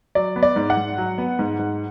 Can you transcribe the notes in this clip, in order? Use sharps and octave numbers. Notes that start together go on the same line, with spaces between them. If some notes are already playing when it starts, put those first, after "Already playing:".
F#3 D5
B3
D5
G#2
F#5
G#2
F#3
B3
G#2
G#2